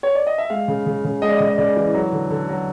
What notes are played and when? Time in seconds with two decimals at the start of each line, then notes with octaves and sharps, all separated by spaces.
0.03 C#5
0.15 D5
0.27 D#5
0.38 E5
0.50 G#3 F5
0.68 C#3
0.86 C#3
1.04 C#3
1.22 G#3 D#5
1.29 D5
1.37 C#3 D#5
1.49 D#5
1.58 C#3 D5
1.76 E3
1.94 F#3
2.12 D3
2.30 D3
2.49 F#3